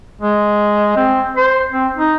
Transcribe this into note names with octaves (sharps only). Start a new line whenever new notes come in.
G#3
C4
C5
C4
D#4